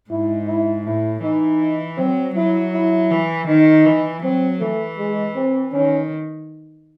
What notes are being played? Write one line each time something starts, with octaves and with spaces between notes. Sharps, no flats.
G#2 E4
E4
A2 E4
E3 D#4
F#3 C4
F#3 E4
E4
E3
D#3 D#4
E3
F#3 C4
E3 A3
G#3
C4
D#3 C#4